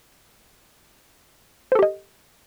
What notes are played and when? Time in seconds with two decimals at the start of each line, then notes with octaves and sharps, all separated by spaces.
1.72 C5
1.75 A4
1.79 G4
1.83 D#5